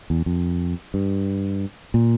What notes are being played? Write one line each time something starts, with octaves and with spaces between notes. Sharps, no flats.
E2
F2
G2
A#2